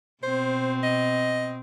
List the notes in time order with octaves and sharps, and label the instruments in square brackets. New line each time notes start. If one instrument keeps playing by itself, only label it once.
[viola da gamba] B2 C4 [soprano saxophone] C5
[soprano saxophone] D#5